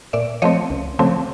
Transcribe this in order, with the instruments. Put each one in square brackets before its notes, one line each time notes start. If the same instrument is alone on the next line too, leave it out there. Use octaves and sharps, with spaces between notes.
[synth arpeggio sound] A#2 D5 E5
F3 A3 C4 C#5 D#5
C#2
C#3 F3 A3 C4